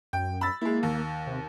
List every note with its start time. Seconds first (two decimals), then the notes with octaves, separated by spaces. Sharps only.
0.13 F#2 G5
0.41 B5 E6 A6
0.61 G#3 A#3 E4
0.83 D#2
1.27 C3